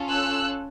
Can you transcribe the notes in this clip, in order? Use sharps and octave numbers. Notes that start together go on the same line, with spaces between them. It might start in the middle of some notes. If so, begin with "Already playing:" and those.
Already playing: C#4 F4 A4
E6 F#6